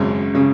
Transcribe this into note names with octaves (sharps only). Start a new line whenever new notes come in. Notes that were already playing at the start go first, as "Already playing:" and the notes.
Already playing: G#1 F#2 C#3
C#3